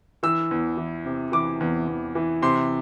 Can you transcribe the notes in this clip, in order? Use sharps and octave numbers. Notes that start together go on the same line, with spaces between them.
E3 E6
E2
E3
C3
E3 D6
E2
E2
E3
C3 C6